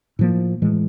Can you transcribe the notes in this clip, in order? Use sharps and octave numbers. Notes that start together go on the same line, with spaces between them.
A2 F3 A#3
A2 E3 G#3